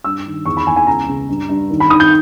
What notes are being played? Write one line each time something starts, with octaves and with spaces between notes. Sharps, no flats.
G2 E6
D#3
E2 C#6
B5
E2 G#5
G#5
C#2 A#5
C#3
G2
G2
D#3
B5
D#3 D#6
G6